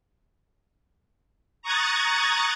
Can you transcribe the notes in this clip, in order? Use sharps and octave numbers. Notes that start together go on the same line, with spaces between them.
A#5 C#6 D#6 F#6 G#6 A6